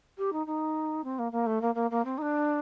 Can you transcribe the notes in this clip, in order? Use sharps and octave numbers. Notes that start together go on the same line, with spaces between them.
G4
D#4
D#4
C4
A#3
A#3
A3
A#3
A#3
A#3
C4
D#4
D4